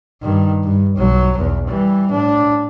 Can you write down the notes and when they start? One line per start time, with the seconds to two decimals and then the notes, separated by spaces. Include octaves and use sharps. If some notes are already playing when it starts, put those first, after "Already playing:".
0.23 G2 D#3
0.64 G2
0.97 B1 F#3
1.37 B1 E2
1.68 E3 G3
2.11 A2 D4